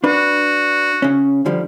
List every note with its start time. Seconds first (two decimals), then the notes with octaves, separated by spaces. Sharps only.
0.04 D4 F#4 B4
1.02 C#3 C#4
1.46 D3 F3 G3